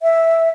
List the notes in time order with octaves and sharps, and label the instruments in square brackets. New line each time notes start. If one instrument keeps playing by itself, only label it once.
[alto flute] E5